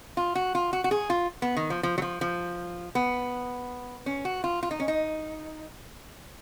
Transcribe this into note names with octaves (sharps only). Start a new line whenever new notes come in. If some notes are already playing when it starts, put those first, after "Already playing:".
F4
F#4
F4
F#4
F#4
G#4
F4
B3
D#3
F3
F3
F#3
F3
F3
B3
C#4
F#4
F4
F4
D#4
C#4
D#4